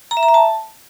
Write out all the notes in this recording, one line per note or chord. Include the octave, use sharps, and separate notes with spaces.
A#5
E5
A#5
E5
A5